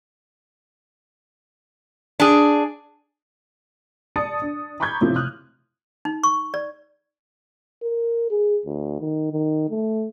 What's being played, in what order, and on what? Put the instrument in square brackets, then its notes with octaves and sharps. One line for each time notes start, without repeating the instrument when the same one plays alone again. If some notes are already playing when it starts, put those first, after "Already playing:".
[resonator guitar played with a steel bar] D4 G#4
[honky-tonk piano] D5 A5 D#6 A6 C#7
D4
A#5 B5 C#6 D6 G6 G#6
A2 C3 E3 F3
D#6 F6 F#6
[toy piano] D#4
C#6
D5
[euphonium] A#4
G#4
D2
D#3
D#3
A3